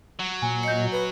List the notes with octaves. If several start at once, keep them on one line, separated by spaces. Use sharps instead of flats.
F#3
A#2 G#5
D#5 G6 C#7
B4